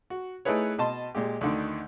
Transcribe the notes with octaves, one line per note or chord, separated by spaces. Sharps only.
F#4
A3 D#4 E4 G#4 B4 C#5
B2 D#5 A5 C6
A#2 G#3 G4
D2 D3 D#3